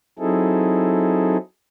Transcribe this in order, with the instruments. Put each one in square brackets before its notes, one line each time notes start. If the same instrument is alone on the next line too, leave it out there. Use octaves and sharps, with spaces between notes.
[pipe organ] F#3 C4 D#4 E4 G#4 A4